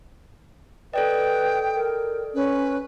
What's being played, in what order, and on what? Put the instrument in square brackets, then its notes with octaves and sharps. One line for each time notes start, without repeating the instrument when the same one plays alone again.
[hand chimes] A4 D5 D#5 [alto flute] B4 [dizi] G5
[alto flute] A#4
[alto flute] C#4 [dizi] B4